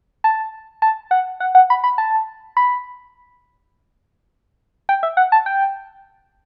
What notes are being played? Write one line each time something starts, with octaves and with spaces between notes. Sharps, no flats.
A5
A5
F#5
F#5
F#5
B5
B5
A5
B5
G5
E5
F#5
A5
G5